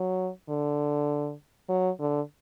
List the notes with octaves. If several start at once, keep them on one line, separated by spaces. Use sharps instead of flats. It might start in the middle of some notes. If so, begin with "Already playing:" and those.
Already playing: F#3
D3
F#3
D3